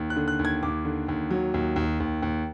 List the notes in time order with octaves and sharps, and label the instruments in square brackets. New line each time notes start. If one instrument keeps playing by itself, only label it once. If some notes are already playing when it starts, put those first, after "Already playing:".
Already playing: [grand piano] D#2
F#6
D3
F#6
D#2
G#6
D#2 D6
D3
D#2
F#3
D#2
D#2
D#2
D#2